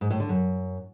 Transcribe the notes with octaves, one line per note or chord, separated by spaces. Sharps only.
G#2
A2
D3
F#2